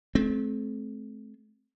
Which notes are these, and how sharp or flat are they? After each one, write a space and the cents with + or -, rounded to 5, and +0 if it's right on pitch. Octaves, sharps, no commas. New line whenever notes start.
A3 -40 C4 +0